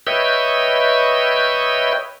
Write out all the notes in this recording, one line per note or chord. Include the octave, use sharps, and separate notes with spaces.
B4 C#5 D#5 E5 G5